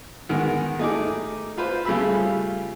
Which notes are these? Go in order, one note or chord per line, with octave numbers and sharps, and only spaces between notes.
G#2 D#3 B3
A3 D#4 G#4 D6
F4 B4 C5
C#3 G3 A3 F4 B5 E6